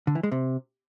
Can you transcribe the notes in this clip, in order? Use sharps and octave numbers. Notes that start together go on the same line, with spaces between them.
D3
E3
G#3
C3